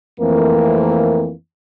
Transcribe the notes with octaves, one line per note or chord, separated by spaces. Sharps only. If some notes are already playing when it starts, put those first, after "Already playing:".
F2 E3 A3 A#3 C4 A#4